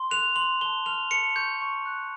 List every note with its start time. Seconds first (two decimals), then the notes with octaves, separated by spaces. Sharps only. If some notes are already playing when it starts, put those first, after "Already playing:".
Already playing: C6
0.11 F#6 F7
0.36 C6 F#7
0.61 A5 G7
0.86 F6 F7
1.11 A5 C#7
1.36 C#6 G6
1.61 C#6
1.86 F#6